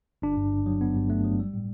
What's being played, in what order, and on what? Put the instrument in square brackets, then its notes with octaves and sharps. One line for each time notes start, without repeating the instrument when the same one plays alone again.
[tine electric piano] G1 D4
G2
G1
F#3
G1 B3
G2
G1 A3
F#3
G3
A2